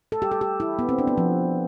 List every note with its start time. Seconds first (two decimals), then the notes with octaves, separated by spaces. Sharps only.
0.12 A4
0.22 G4
0.32 A4
0.41 G4
0.60 E4
0.79 B3
0.89 C4
0.99 D4
1.07 B3
1.18 F3